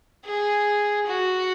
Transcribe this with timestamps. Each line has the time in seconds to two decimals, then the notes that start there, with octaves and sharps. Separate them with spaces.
0.25 G#4
1.07 F#4